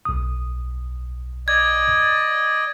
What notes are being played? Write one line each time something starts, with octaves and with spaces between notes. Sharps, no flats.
B1 D#6
D5 D#5 G#6